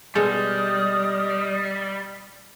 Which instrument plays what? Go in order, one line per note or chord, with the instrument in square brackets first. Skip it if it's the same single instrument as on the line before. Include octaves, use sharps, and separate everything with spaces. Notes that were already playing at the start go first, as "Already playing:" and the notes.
[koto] B2 G#3 A4 [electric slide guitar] G3 [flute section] D#5 D#6 F6